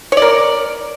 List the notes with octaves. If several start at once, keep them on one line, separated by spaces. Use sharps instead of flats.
A#4 C#5 D5